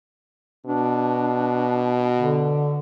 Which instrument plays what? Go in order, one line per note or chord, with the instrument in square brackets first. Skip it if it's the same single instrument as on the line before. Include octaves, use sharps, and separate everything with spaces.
[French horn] B2 [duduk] D4
[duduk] D3